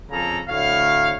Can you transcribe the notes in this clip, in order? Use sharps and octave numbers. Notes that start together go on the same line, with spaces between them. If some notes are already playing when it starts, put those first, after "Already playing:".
F2 C#3 A#3 A4 A#5
D2 A2 C#5 F5